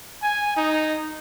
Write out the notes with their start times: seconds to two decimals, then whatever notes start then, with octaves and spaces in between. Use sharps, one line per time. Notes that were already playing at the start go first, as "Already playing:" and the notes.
0.22 G#5
0.56 D#4